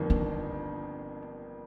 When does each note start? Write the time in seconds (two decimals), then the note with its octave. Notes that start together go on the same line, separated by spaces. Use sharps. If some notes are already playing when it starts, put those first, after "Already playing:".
Already playing: G1 F2 D#3 A#3
0.10 D4